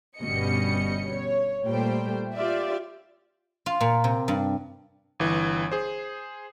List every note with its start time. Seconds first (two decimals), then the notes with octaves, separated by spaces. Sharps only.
0.18 G1 B2 G3 C#4 D#5 C#7
1.10 C#5
1.66 A#2 G3 A3 C5 G5
2.34 F4 G4 D5 E5
3.66 F4
3.81 A#2
4.04 C3
4.28 G2
5.20 G1 E3
5.71 G#4 C5